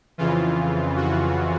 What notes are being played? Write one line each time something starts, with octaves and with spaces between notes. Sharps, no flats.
F2 C#3 E3 F4
F#4